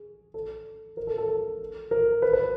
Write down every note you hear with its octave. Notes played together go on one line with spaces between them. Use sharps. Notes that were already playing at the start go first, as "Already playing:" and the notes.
Already playing: G#4
A4
A#4
A4
A4
A4
A#4
B4
B4